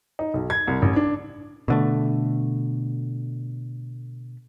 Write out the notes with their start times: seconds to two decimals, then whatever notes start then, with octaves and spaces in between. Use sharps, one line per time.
0.19 D#4
0.34 B1
0.50 G#6
0.67 C2
0.82 A1
0.96 D4
1.68 B2 D3 A3